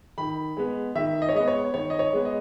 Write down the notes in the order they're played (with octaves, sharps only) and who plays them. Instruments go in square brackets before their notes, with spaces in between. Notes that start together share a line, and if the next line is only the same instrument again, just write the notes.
[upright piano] D#3 B5
G#3 B3
D#3 E5
D#5
C#5
G#3 B3 D#5
C#5
D#3 C#5
D#5
C#5
G#3 B3
D#5